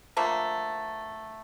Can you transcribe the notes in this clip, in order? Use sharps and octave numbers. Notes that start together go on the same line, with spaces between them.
D3 F3 A3 A#3